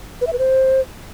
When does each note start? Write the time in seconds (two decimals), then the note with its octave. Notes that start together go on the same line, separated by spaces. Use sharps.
0.21 B4
0.27 E5
0.33 B4
0.38 C5